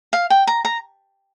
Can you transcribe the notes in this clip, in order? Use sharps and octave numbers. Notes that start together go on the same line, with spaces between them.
F5
G5
A#5
A#5